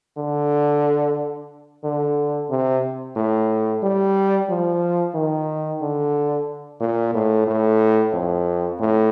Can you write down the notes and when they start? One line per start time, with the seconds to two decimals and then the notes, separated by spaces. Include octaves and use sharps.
0.17 D3
1.84 D3
2.50 C3
3.16 A2
3.83 G3
4.49 F3
5.14 D#3
5.81 D3
6.80 A#2
7.14 A2
7.47 A2
8.13 F2
8.80 A2